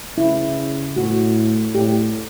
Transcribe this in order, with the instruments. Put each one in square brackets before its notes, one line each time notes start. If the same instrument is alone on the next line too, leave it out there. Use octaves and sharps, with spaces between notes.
[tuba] C#3 [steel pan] E4
[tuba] A2 [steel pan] F#4
[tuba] A2 [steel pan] G4